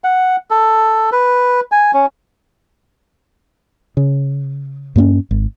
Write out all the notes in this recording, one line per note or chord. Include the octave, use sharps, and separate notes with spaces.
F#5
A4
B4
G#5
C#4
C#3
G2 A#3 C4 C#4
G#1